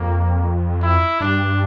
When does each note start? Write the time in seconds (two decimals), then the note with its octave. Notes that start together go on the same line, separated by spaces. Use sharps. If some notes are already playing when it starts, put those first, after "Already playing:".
Already playing: F2 A#3
0.83 E4
1.21 G2 D4